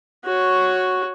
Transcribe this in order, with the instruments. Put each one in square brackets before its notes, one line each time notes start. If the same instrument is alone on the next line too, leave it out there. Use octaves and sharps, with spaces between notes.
[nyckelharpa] F#4 C#5